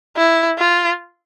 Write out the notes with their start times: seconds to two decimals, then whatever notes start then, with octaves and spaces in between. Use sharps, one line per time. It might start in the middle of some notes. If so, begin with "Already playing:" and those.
0.16 E4
0.58 F4